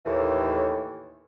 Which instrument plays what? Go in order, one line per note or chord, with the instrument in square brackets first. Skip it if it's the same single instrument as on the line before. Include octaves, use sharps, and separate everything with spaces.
[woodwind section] D#2 A2 E3